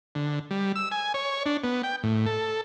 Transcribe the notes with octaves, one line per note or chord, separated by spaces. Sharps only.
D3
G3
E6
G#5
C#5
D4
B3
G5
A2
A4